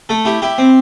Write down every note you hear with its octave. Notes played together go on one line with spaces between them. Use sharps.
A3 A4
E4 G4
E4 G4
C4